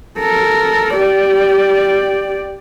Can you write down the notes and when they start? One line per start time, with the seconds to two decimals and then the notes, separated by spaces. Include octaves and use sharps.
0.19 A4 A#4
0.96 G4 D5